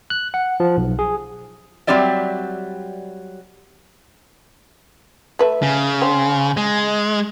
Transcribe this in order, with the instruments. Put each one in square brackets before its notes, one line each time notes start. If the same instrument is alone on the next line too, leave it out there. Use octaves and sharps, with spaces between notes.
[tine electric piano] F#6
F#5
F3
B1
G#4
[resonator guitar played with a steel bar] F#3 G3 C4 G4 D5 E5
[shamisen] A3 B4 E5
[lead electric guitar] C#3
[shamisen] C4
[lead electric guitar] G#3